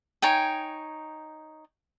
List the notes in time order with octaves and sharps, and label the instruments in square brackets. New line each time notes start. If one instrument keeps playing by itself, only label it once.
[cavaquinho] D#4 C#5 G5 G#5